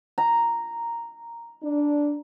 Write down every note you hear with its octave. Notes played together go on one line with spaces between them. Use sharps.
A#5
D4